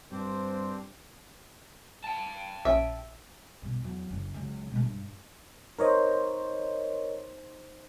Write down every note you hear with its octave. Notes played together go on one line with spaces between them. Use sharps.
G2 C4 D4 C5
G5 A5
A#1 C#4 E5
G2 B2
E2 F#3
F#1 F#2
C#2 F#3
B2 G#3
G2
D#4 A#4 C5 C#5 D#5